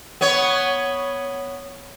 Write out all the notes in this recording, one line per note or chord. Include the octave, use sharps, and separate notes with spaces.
B3 C#5